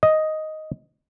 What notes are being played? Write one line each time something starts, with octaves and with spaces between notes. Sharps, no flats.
D#5